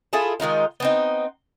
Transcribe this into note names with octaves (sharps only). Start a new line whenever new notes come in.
E4 F4 G#4 A4
D#3 G#3 D#4 F4
B3 C4 D#4